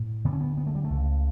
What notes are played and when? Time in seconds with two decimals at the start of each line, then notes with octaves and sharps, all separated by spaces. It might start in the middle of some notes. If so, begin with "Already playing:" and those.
Already playing: A2
0.25 D2 D3 B3
0.33 C#4
0.41 B3
0.57 B3
0.67 A3
0.75 G3
0.84 A3
0.90 C#2 C#3